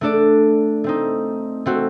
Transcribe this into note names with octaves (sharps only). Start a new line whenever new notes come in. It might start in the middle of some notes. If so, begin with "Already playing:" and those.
A3 D4 A4 D5
A3 C4 D#4
A3 C4 F#4